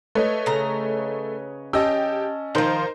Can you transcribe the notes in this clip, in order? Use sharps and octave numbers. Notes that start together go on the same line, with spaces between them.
A3 B4 C#5 D#5
C#3 A#5
C#4 G4 D#5 A5 E6
D#3 F3 D#4 A#4 C5